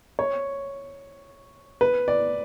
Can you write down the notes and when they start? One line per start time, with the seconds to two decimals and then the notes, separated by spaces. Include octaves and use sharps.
0.19 C#5
1.81 B4
2.08 D5